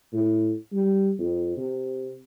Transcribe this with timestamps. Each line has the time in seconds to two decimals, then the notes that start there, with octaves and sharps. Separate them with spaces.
0.13 A2
0.72 G3
1.18 F2
1.57 C3